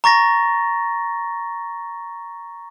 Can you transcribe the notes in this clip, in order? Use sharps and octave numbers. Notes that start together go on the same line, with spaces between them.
A#5 C#6 A6 A#6